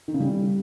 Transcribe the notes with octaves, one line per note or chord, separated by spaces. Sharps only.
D#3
C#3
G3